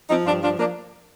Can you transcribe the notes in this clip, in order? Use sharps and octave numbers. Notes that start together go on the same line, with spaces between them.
F3 C4 D#4
G2 D4 F4
F3 D4 F4
F3 A#3 D4